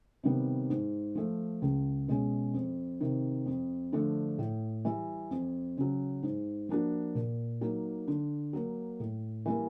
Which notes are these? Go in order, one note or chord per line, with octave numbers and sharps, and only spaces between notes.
C3 D#3 G3 B3
G#2
F3 A3
C#2
B2 G#3 C#4
F2
C3 D#3
F2
D3 F3 A3 D4
A2
E3 G3
F2
C#3 F#3
G#2
F3 A#3 D4 F#4
A#2
F#3 A#3 D#4
D3
F#3 A#3
A2
E3 G3 A#3